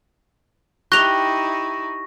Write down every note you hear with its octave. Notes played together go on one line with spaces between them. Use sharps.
D#4 E4 G4 C#6 F#6 A#6 F7 G7